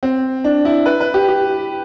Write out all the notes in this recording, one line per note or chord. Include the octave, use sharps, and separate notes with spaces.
C4
D4
E4
B4
B4
G4
G4